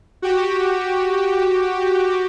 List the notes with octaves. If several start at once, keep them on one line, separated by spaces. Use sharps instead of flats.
F#4 G4